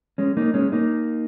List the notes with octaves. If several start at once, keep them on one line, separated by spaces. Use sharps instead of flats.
G#3 C#4
A#3 D#4
G#3 C#4
A#3 D#4